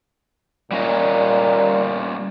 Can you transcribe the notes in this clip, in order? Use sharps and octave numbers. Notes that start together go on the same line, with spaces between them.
A#2 G3 C#4 D#5